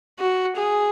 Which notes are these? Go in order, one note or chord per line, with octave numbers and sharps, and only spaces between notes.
F#4
G#4